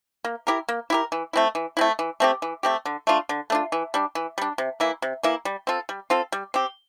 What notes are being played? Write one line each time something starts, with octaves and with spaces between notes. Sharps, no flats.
A#3
E4 G4 A#4
A#3
E4 G4 A#4
E3
A3 C4 E4
E3
A3 C4 E4
E3
A3 C4 G4
E3
A3 C4 G4
D3
A3 D4 F4
D3
A3 D4 F4
E3
G3 D4
E3
G3 D4
C3
E3 A#3 E4
C3
E3 A#3 E4
G3
C4 F4 A4
G3
C4 F4 A4
G3
C4 G4